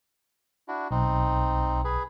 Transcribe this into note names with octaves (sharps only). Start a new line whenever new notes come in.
D4 E4 F#4
B1 C4 D#4
G#4 B4